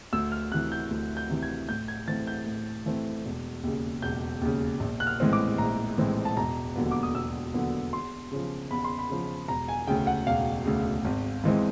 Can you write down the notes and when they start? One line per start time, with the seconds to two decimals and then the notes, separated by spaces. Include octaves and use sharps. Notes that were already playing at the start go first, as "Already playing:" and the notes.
0.13 D2 E6
0.32 F6
0.52 C3 E3 F#6
0.72 G6
0.91 D2
1.17 G6
1.30 C3 E3
1.43 G#6
1.69 A2 G6
1.88 G#6
2.08 E3 A3 C4 A6
2.27 G6
2.46 A2
2.86 E3 A3 C4
3.25 E1
3.64 D#2 C#3
4.02 E1 G6
4.41 D#2 C#3
4.80 A#1
5.00 F#6
5.07 F6
5.20 A2 E3 G#3 C4
5.33 D6
5.58 A#1 A#5
5.98 A2 E3 G#3 C4
6.25 A5
6.36 E1 A#5
6.76 D#2 D3 F#3 B3
6.91 D6
7.03 D#6
7.14 E1 E6
7.54 D#2 D3 F#3 B3
7.93 E2 C6
8.31 C#3 F3
8.71 E2 B5
8.84 C6
8.99 B5
9.10 C#3 F3
9.48 E1 A#5
9.68 G#5
9.87 D2 C#3 G5
10.07 F#5
10.27 E1 F5
10.66 D2 C#3
11.05 G#1
11.44 G#2 E3 G#3 C4